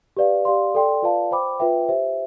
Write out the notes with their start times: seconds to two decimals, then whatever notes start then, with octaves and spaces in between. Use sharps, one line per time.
0.17 G4 B4 D5 F5
0.45 G4 D5 F5 C6
0.75 A4 D5 G5 C6
1.02 F4 B4 D5 F5 A5
1.31 C5 G5 B5 D6
1.60 F4 B4 E5 G5
1.89 G4 C5 E5